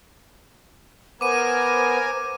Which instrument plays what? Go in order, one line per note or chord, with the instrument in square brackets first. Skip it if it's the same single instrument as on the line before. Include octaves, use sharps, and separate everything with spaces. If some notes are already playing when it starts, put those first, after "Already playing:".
[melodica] B3 [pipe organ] A#4 G#5 [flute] C5 [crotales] D6 D#7